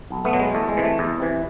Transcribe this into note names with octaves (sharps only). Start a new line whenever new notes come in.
B1
A3 B3
B2 F#3
G#3
E2 A3
G#3
C3 E3
A3
E2
C3 E3